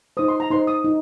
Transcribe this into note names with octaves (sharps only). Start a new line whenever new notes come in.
D#4 C5 D#6
C6
A#5
D#4 C5 C6
D#6
D#4